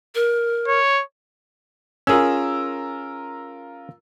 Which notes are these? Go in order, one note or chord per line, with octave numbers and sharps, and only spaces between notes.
A#4
C#5
C#4 F4 G#4 A#4 E6